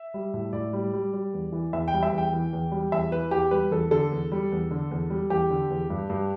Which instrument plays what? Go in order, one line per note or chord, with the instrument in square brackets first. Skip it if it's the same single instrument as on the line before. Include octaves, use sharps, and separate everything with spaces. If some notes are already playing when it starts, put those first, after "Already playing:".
Already playing: [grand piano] E5
G3
A2
A2 D5
G3
G3
G3
E2
E3
E2 E5
G5
G3
E5
E2
G5
E3
E2
G3
E2 E5
E3 B4
E2 G4
G3 B4
E2 A4
D3 A4
E2
G3
E2
D3
E2
G3
E2 G4
D3
E2
G2
G2